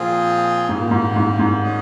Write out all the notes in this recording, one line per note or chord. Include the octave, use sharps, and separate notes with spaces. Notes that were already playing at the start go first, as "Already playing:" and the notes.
Already playing: A#2 F3 C4 F4 G#4
G#2 C#3 G3 A#3
A#2
G#2
G#2
G#2
G#3 C#4 G#4